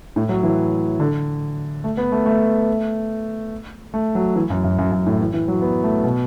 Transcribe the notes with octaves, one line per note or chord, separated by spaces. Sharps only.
A2
F#3
E3
D3
A3
B3
A3
A3
A3
F#3
E3
F#2
F#2
F#2
F#2
A2
E3
E3
F#3
B3
A3
B2